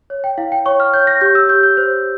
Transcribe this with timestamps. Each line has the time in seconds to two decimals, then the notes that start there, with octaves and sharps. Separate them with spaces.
0.10 C#5
0.24 G5
0.38 E4 F5
0.52 G5
0.66 C#5 C#6
0.80 F6
0.93 C#5 G6
1.07 A#6
1.21 G4 G6
1.35 E6
1.49 G4 G6
1.63 G6
1.77 C5